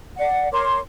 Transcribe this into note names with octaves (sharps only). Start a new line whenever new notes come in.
D5 F#5
A#4 C#5 C6 D6